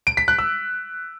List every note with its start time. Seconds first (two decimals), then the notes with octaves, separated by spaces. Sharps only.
0.07 D7
0.17 B6
0.28 F#6
0.39 E6